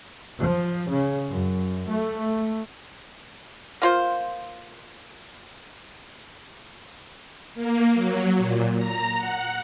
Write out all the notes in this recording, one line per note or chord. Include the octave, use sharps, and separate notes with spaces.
F3
C#3
F#2
A3
A#3 F4 C5
A#3
F#3
A#2
A#5
F#5